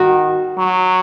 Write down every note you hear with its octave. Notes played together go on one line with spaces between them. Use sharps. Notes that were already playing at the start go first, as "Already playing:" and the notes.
Already playing: D#3 F#4
F#3